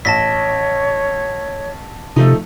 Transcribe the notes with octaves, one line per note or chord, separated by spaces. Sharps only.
A1 C#5 A5 A#6 B6
C3 F3 A3 D#4 A4